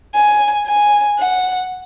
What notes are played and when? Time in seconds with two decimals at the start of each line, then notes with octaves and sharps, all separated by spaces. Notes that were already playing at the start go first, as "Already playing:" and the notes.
0.15 G#5
0.67 G#5
1.19 F#5